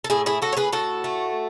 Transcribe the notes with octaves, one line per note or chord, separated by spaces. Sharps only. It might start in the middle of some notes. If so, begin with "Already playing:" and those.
A4
A2 E4 G#4
E4 G#4
A2 F#4 A4
C#5
G#4 B4
A2 F#4 A4
A3